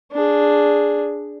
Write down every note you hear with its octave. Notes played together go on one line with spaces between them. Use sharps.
D4 G#4